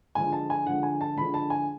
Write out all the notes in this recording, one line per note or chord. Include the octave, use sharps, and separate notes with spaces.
D3 F3 G#3 G#5
A5
G#5
D3 F3 G#3 F#5
G#5
A5
D3 F3 G#3 B5
A5
G#5